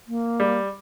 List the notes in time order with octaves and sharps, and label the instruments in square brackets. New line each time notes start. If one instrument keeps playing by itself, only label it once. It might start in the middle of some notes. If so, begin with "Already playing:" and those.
[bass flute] A#3
[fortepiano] G3